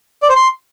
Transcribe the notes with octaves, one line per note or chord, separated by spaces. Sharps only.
D5
C5
C6